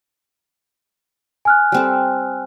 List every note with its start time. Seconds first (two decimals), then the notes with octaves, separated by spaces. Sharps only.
1.45 G#5 F6 F#6
1.72 G3 C4 A4